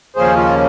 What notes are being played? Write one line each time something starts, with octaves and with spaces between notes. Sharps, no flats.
D#2 C#3 F3 A#3 C#4 G#4 C5
F4